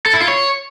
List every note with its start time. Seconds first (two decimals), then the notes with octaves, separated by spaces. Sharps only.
0.06 A4
0.13 E4
0.21 F4
0.28 C#5